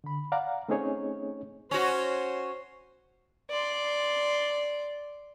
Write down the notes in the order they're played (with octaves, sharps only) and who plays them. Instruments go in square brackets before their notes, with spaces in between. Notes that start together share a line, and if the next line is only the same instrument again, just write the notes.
[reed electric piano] D3 B5
D5 F5 F#5 A#5
A3 C4 C#4 D#4 G#4 C#5
[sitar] C#4 F#4 [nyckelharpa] C5
[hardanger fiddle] D5 C6